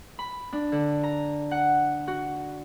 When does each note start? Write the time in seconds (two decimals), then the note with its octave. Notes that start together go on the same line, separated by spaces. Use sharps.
0.19 B5
0.53 D4
0.72 D3
1.03 A#5
1.51 F#5
2.08 F#4